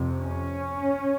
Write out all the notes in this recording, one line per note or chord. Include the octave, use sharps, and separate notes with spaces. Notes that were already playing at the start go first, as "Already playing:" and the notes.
Already playing: F2 C3
C#4